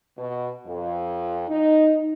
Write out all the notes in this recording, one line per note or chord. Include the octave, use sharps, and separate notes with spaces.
B2
F2
D#4